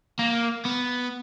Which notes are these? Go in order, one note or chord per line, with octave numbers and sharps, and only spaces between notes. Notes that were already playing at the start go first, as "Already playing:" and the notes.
A#3
B3